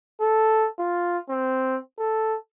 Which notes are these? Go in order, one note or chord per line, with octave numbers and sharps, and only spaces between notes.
A4
F4
C4
A4